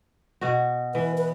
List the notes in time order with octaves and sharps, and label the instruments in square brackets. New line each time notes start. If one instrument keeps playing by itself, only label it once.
[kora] B2 F#4
[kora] E3 [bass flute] B4
[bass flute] B4